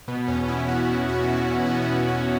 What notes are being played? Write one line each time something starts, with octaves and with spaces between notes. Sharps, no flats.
B2 B3
E2 C#4
B2 E4
E2 F#4
B2 E4
E2 F#4
B2 E4
E2
E4
C#4
B2
B3
C#4
E2 B3
B2 C#4